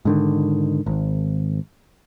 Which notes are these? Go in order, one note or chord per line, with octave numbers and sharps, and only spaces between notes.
G#2 D3 D#3
G#1